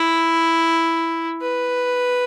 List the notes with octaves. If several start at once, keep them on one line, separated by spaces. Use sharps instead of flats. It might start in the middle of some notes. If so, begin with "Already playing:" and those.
Already playing: E4
B4